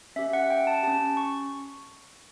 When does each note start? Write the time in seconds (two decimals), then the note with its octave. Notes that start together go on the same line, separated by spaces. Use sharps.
0.16 C#4 G4 E5
0.33 F#5
0.50 G5
0.67 A5
0.83 C#4 G4 A5
1.17 C#6